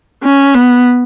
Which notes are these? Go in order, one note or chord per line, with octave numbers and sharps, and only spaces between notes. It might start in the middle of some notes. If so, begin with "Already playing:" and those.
C#4
B3